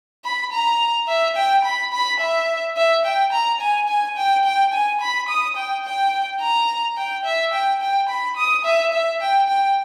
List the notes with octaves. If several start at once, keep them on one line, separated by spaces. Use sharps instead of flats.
B5
A#5
E5
G5
B5
B5
E5
E5
G5
A#5
G#5
G#5
G5
G5
G#5
B5
D#6
G5
G5
A#5
G5
E5
G5
G5
B5
D#6
E5
E5
G5
G5